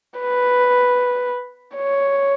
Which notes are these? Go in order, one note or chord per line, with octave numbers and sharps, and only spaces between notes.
B4
C#5